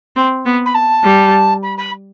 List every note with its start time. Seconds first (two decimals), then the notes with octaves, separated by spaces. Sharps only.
0.16 C4
0.46 B3
0.66 B5
0.75 A5
1.04 G3
1.63 B5
1.78 B5